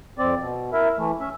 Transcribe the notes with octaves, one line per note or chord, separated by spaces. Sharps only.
F2 C4 D5
B2
E4 A#4 E5
E3 A3
C#4 E5